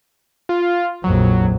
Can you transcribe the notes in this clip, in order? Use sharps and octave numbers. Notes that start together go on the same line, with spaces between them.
F4
A#1 F2 F#3